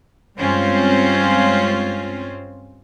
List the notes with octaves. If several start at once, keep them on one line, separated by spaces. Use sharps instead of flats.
G2 G#3 C4 C#4 F4